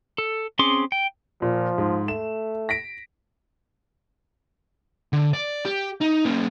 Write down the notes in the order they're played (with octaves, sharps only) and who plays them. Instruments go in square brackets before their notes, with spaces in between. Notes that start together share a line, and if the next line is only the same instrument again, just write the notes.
[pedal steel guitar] A4
C4 C#4 G#4 C6 D6
G5
[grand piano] A#2 [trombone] F3
[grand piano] G#2
[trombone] A3 [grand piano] E7
[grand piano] A#6 B6 D7
[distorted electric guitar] D3
D5
G4
D#4
A#3 C#4